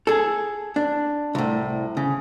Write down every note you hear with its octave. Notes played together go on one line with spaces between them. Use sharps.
G#4 A4
D4
C2 A2
C#3